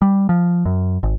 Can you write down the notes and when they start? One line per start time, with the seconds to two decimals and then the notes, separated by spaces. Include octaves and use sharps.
0.02 G3
0.29 F3
0.65 F#2
1.03 G#1